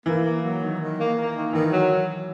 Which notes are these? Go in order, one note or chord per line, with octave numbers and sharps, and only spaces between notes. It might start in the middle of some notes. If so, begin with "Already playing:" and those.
E3 A#3
A#3
F#3
D#3
D#3
A#3
A#3
D#3
D#3 E3
F#3